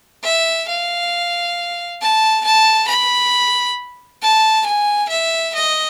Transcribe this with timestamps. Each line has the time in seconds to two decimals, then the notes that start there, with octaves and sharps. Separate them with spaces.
0.24 E5
0.69 F5
2.01 A5
2.45 A5
2.89 B5
4.22 A5
4.66 G#5
5.10 E5
5.55 D#5